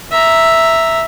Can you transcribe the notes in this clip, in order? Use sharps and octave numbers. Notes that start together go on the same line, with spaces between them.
E5 A#5